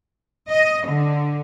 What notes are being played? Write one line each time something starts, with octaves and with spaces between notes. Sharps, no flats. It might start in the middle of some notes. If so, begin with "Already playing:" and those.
D#5
D3